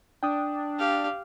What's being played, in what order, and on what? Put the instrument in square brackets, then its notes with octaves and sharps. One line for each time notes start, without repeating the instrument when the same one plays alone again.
[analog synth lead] D4 [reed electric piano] G5 D#6
[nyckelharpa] G4 F5